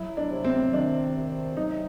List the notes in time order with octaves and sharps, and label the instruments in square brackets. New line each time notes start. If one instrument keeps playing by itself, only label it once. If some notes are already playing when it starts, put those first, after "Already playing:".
Already playing: [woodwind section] F#3 [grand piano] E4
[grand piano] D4
[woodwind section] C3
[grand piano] C4
[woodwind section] D#3 [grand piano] D4
[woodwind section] C3
[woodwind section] F#3 [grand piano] D#4